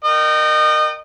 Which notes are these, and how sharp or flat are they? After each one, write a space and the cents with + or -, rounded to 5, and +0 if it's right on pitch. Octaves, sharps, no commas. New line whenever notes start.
A#4 +0 D#5 -30 G5 -25